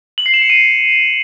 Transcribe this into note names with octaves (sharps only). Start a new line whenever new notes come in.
F#7
C7
E7
C#7
D#7